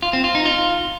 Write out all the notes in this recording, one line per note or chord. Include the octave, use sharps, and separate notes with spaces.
F4
C4
F4
D#4
F4